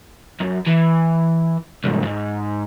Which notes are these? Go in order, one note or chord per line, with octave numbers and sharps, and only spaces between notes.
F#2
E3
C2 G#2
E2 G#2